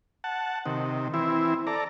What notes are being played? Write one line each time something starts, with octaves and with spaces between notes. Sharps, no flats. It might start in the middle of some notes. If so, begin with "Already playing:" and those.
F#5 A5
C3 D#3
E3 C4 E4
A4 D5 A#5